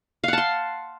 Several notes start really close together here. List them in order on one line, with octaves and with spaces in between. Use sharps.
F5 F#5 A5 C6